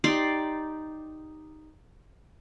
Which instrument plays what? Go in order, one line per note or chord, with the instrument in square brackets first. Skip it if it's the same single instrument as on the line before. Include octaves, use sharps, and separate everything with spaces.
[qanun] D#4 G4 D5 C6